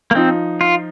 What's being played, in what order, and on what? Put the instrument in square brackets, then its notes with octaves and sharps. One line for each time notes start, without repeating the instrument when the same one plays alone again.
[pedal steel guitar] A#3
[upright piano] F3 D#4 [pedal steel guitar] C4
[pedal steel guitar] F4